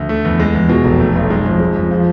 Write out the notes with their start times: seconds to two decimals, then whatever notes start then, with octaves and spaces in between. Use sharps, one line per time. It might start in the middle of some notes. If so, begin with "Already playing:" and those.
Already playing: D2
0.09 A3
0.25 E2
0.39 G#3
0.54 E2
0.69 B2
0.85 F1
1.00 A3
1.15 B1
1.30 G#3
1.46 F2
1.60 G#3
1.76 F2
1.91 F3